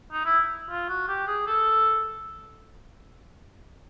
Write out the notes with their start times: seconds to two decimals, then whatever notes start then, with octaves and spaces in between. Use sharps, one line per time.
0.12 D#4
0.25 E4
0.70 F4
0.89 F#4
1.08 G4
1.28 G#4
1.47 A4